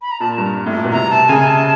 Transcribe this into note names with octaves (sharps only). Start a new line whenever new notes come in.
B5
A#5
A#2 A5
G2 A#5
A2
A#2
B2
C3 A#5
A5
C#3 G#5
A5